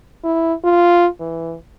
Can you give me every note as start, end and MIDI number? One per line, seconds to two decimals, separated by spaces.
0.24 0.54 64
0.64 1.07 65
1.20 1.55 52